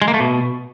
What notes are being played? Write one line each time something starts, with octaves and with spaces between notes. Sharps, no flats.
G#3
A#3
A3
B2